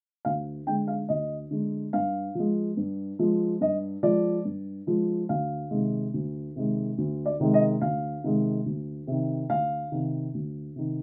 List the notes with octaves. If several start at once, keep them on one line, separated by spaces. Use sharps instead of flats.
D2 F5
D3 G#3 G5
F5
D2 D#5
D3 G#3
G2 F5
F3 G#3
G2
F3 G#3
G2 D#5
F3 G#3 D5
G2
F3 G#3
D2 F5
C3 D#3 G#3
D2
C3 D#3 G#3
D2
D5
C3 D#3 G#3
D#5
D2 F5
C3 D#3 G#3
D2
C3 D#3
D2 F5
C3 D#3
D2
C3 D#3